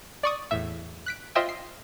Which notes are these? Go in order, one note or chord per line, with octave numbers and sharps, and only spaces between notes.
D5 C#6 D#6
E2 A2 E5
F#6 B6 D7
F4 C5 D#5 E5 G5
C7